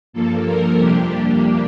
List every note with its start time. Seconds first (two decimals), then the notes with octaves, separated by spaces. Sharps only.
0.13 G2 F3 A#3 A4
0.45 A#4
0.77 F2 C3 G3 A#3 D4 G4